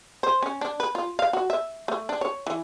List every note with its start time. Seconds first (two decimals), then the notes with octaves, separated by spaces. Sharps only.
0.23 C5
0.42 C#4
0.61 D4
0.80 B4
0.95 F4
1.19 F5
1.33 F#4
1.50 E5
1.88 A3
2.09 D4
2.21 C#5
2.47 E3